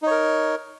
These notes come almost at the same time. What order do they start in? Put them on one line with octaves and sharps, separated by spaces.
D#4 C#5 A#4